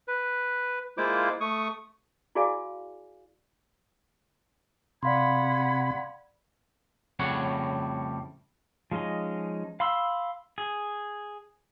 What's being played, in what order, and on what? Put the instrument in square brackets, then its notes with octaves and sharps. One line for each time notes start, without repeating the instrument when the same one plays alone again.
[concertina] B4
G#3 A#3 E4 F4 C5 D6
A3 C#6 D#6
[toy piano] E4 F#4 G#4 D5 F5 G#5
[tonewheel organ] C3 [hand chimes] D5 F5 C6 [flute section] F#5 B5 G#6
[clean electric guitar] F2 A2 C#3 G3 C#5 F#5
[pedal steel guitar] F3 G#3 C#4 D#4 D#5
F5 B5 C6 E6
G#4